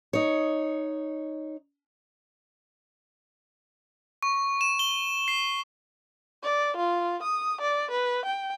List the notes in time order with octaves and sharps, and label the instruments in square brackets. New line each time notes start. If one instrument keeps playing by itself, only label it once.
[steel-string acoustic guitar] D#4 C#5
[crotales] C#6
E7
G7
C7
[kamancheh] D5
F4
D#6
D5
B4
G5